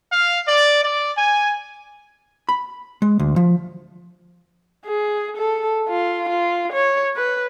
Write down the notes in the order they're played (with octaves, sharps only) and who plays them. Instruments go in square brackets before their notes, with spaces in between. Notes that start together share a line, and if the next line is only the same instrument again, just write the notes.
[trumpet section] F5
D5
D5
G#5
[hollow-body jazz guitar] B5
G#3
D2
F3
[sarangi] G#4
A4
F4
F4
C#5
B4